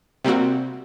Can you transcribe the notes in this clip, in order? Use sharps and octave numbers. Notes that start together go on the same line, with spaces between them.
C3 G3 A#3 C4 F#4